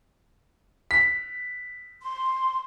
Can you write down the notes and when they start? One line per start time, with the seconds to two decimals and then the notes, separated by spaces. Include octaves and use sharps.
0.91 B6
2.03 C6